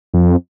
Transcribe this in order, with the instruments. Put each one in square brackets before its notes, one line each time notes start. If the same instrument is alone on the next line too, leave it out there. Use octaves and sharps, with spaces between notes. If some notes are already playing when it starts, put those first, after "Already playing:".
[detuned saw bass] F2